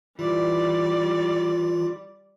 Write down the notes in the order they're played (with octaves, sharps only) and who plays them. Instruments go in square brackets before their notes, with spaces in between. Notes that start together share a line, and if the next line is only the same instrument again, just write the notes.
[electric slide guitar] E3 [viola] G3 D5 [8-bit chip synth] F4